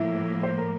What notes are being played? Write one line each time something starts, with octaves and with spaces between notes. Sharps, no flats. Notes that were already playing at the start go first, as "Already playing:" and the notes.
Already playing: A2 F3 A#3 E4
C5
A#4